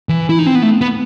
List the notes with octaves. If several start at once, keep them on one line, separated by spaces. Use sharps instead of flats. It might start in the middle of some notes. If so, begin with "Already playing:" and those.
E3
E4
D#4
C4
B3
A3
B3